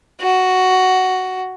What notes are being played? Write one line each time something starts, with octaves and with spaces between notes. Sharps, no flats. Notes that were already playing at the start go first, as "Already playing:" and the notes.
F#4